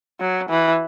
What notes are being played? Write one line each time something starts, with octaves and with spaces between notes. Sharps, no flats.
F#3
E3